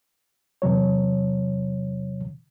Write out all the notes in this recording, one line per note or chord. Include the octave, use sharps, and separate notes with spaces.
E2 C3 F#3 C#5